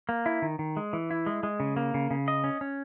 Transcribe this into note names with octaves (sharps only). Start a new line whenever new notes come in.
A#3
E4
D#3
D#3
G#3
E3
E4
G#3
G#3
C#3
A#3
C#3
C#3
D#5
C#4
C#4